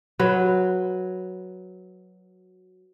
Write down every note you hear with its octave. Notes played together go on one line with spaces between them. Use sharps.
F#3 B4